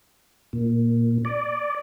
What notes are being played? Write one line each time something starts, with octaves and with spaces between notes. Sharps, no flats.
A#2
D5